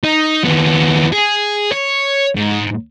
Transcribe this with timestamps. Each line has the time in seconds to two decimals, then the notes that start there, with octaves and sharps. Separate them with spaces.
0.04 D#4
0.44 D#2 B3
1.13 G#4
1.72 C#5
2.36 G#2